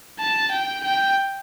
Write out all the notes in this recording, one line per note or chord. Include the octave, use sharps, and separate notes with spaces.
A5
G5
G5